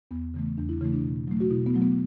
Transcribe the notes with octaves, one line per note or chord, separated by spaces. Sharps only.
E2 B3
C#3 E3 A3
E2 D4
E4
C#3 E3 A3 E4
D4
B2
F#3 A3
F#4
B2 E4
B3
F#3 A3
B3